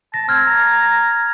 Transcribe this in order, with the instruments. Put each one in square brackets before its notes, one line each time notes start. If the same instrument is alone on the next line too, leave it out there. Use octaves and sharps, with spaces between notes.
[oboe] A5 [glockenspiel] A#6
[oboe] C4 [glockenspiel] F6 G#6
[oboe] A#5